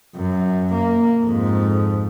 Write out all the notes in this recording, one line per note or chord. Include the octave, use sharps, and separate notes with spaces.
F#2
A#3
F2 G#2